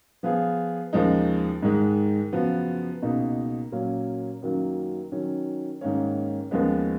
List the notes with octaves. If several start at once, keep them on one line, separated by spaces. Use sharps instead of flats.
F3 B3 F4 G#4
D#2 C#3 F3 G#3 D#4
G#2 D#3 G#3
F#2 C#3 F3 B3 F#4
C#2 B2 A#3 D#4
A#2 F#3 A#3 C#4
F#2 D#3 F#3 A#3
D#3 F#3 C#4
G#2 D#3 A#3 C#4
D#2 C#3 F3 G#3 B3